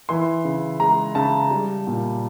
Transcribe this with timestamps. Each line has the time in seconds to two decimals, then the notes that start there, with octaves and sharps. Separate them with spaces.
0.09 E3 C6
0.45 C#3
0.80 G#3 A#5
1.15 C#3 A5
1.51 G3
1.87 A#2